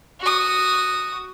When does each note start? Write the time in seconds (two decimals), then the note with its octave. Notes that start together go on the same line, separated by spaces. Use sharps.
0.21 F#4 D#6